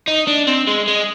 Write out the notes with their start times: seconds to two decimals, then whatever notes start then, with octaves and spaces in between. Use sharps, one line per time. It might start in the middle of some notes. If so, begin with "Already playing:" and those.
0.07 D#4
0.27 D4
0.47 C4
0.67 G#3
0.88 G#3